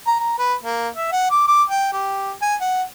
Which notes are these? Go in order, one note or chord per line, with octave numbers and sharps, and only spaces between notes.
A#5
A#5
B4
A#3
E5
F#5
D6
D6
G5
G4
G#5
F#5